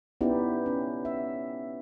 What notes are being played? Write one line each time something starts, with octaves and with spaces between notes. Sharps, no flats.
B3 C#4 D#4 E4 G4 D5
C#4
E5